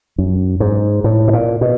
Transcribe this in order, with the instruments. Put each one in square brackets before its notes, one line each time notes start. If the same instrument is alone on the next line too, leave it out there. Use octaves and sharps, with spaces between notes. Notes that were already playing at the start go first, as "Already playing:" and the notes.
[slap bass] F#2
G#2
A2
B2
A#2
B2